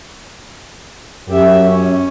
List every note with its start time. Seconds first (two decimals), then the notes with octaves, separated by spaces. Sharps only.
1.29 F#2 G4 E5
1.67 C#4